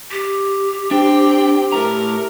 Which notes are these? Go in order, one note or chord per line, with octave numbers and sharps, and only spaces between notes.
G4
C4 D4 G5
A2 A3 A#4 A#5